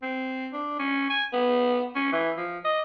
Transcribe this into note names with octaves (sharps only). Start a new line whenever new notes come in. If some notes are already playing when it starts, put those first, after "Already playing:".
C4
D4
C#4
G#5
B3
C#4
E3
F3
D#5